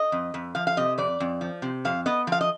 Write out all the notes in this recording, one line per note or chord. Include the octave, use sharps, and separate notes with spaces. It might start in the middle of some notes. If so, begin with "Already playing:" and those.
Already playing: D#5
F2
F2
F3 F5
F5
C3 D#5
F2 D5
F2
F3
C3
F2 F5
B3 D#5
F3 F5
D#5